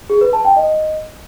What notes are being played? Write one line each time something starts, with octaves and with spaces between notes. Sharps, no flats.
G#4
B4
A5
G5
D#5